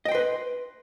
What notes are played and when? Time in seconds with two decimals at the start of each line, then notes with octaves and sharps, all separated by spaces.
0.05 D#5
0.08 G5
0.12 C6
0.15 B4